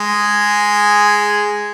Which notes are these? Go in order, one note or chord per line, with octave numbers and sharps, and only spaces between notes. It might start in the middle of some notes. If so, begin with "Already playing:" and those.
Already playing: G#3 G#4